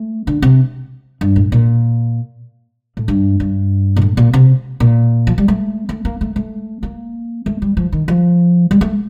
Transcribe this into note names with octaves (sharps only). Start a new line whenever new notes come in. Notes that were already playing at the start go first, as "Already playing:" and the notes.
Already playing: A3
D3
C3
G2
A2
A#2
A2
G2
G2
A#2
A2
A#2
C3
A#2
F3
G3
A3
A3
A#3
A3
A3
A#3
A3
G3
F3
D#3
F3
G3
A3